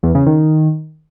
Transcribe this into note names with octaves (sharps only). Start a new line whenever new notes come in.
E2
C#3
D#3